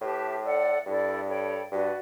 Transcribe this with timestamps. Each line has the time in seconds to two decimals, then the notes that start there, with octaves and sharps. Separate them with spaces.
0.01 A2 G4 B4 E5 A5
0.43 A4 D5 F#5
0.86 G2 E4 A4 D5
1.29 A4 C#5 G5 B5
1.71 G2 F#4 B4 D5